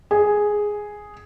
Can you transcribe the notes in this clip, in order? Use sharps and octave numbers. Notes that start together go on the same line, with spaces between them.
G#4